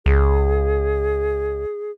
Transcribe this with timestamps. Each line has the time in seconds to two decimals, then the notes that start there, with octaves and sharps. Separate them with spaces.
0.06 C#2 G#4